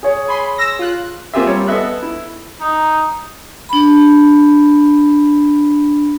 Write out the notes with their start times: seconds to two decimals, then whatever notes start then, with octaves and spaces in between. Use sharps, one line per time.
0.03 G#4 C#5
0.27 G#5 B5 C6
0.58 E6 A#6
0.79 F4 F#6
1.34 A#3 C4 F4 G4 G#4 E5
1.46 G3 C#5
1.68 B3 A4 D#5 E5 F#6
2.02 E4
2.60 D#4
3.69 D4 B5